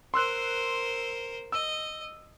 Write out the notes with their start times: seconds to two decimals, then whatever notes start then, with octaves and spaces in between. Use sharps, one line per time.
0.14 A#4 C5 C6 E6 F#6
1.52 D#5 E6